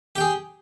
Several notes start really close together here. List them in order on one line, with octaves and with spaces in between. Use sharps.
G4 G5 G#4